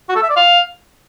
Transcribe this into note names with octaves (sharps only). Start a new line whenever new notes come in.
F#4
A4
E5
D5
F5